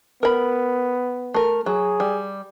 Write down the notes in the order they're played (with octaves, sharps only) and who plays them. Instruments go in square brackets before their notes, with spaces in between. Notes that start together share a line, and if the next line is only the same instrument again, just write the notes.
[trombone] B3 [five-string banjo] A#4 B5
[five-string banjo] A3 A#4
[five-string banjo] F#3 [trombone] G#4
[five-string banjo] G3